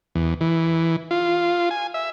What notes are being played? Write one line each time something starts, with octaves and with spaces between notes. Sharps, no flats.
E2
E3
F4
G#5
E5